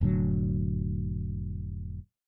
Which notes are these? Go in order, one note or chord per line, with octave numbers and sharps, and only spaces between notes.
F1 A2 D3 F#3